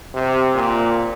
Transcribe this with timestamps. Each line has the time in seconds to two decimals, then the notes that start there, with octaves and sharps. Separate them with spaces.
0.14 C3
0.55 A#2